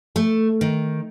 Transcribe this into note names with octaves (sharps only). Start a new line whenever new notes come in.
A3
D#3